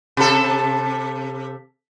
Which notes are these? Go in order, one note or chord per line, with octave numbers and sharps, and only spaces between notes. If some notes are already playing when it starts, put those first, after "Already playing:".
C3 A4